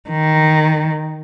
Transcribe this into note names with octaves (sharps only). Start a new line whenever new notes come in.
D#3